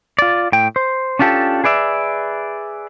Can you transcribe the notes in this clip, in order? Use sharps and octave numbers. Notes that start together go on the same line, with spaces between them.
F4 D5
A2 G5
C5
C#4 D4 F4 G4 A4
G#4 B4 D5 E5